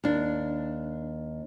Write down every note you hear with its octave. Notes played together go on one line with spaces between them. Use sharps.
D#2 D4